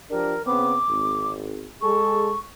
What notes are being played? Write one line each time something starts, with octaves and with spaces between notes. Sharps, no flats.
F3 D4 G4 A#4
C#3 B3 C4 D6
G#1
G#3 G#4 A4 C#6